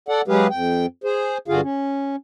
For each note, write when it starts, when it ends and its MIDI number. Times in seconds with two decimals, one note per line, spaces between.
0.09 0.22 69
0.09 0.22 74
0.09 0.22 78
0.28 0.47 54
0.28 0.47 56
0.28 0.47 67
0.28 0.47 68
0.28 0.47 71
0.28 0.47 77
0.50 0.86 41
0.50 0.86 79
1.04 1.38 68
1.04 1.38 72
1.48 1.61 43
1.48 1.61 50
1.48 1.61 65
1.48 1.61 66
1.48 1.61 68
1.48 1.61 77
1.62 2.16 61